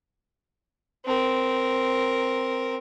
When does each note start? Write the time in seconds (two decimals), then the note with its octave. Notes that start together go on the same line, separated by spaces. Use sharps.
1.06 C4 A#4